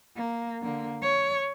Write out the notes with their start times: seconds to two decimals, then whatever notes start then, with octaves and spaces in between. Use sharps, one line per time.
0.16 A#3
0.62 D3 A#3
1.02 C#5